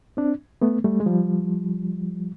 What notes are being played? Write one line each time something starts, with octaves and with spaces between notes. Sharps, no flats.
C4 D4
A3 B3
G3 A3
G#3
F3 G3